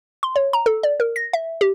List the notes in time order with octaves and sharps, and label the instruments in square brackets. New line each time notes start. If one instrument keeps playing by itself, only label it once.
[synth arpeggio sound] C6
C#5
A#5
A4
D5
A#4
A#6
E5
G4